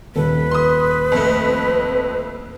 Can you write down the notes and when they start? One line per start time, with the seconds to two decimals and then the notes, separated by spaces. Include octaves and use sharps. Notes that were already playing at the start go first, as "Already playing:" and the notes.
0.16 D#1 A4 B4
0.51 C6 D#6
1.12 F2 A3